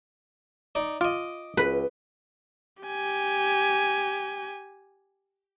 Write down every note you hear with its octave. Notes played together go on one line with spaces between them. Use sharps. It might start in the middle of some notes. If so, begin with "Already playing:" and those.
D#4 D5
F4 D#5 D6
C#2 B4
G4 G#5